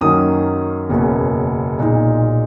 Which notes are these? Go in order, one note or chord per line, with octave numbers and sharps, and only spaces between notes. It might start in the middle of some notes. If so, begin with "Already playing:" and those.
F#2 D#3 F#3 A#3 C#4 D#6
F#1 E2 B2 A#3 C#4
B1 A#2 G#3 D#4